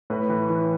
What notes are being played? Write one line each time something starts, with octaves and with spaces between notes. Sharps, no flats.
A2 B4
E3 B4
E3